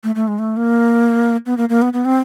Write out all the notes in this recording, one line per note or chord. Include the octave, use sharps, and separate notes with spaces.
A3
A3
G#3
A3
A#3
B3
A#3
A#3
B3
B3
C4